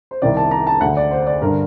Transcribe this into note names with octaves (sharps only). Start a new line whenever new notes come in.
C5
C2 C3 D#3 D5
A5
A#5
A5
D2 D3 F#5
D5
C5
D5
G2 D3 A#4